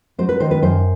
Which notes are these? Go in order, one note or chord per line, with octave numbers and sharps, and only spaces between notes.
F#3 C5
B4
D#3 C5
B4
F#2 C5